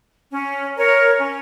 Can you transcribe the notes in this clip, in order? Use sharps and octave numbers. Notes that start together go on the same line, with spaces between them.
C#4
A#4 C#5
C#4